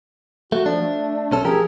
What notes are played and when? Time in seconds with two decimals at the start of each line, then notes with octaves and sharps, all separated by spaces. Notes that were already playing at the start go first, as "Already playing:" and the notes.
0.52 A3 F#4
0.66 F3 D4
0.82 A3
1.31 B1 C#4 A4
1.45 F3 G4 G#4 A#4